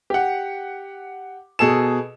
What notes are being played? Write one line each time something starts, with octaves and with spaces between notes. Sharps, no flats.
G4 F#5
B2 G#4 A4 E7